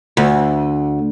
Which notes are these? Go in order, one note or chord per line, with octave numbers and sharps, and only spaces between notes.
D2